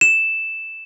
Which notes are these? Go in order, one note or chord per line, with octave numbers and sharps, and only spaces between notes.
E7